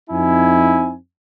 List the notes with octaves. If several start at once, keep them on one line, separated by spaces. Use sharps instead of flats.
F2 C4 D#4 E4 G#5